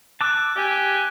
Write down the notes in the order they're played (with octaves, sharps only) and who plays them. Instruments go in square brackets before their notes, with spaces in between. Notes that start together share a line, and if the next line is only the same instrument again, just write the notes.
[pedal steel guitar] A5 D6 E6 [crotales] F#6
[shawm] G4 [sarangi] G#5